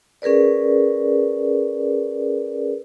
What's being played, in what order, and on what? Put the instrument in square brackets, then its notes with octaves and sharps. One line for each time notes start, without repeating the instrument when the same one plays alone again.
[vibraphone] C#4 G#4 A#4 B4 D5